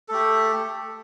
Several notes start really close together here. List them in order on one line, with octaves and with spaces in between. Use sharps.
A4 A3 G4